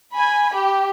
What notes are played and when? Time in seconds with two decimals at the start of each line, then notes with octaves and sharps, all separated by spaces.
0.16 G#5 B5
0.53 G4